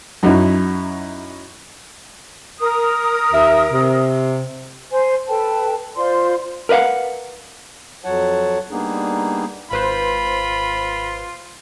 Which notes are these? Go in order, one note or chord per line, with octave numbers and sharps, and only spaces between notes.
F#2 F#3 D#4 E4
A#4 D#6
D#2 E5
C3
C5 G#5
A4 B4 G5 A5
F4 C5 D5 C6
A#4 B4 D#5 F5 F#5
F2 F#3 C#5 F#5 A5
G3 A#3 B3 D4 D#4 G#4
G#1 F4 B4 C5 B5